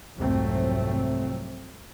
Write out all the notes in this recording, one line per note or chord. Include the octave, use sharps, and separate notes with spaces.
C2 F2 G#2 F#3 A3 C4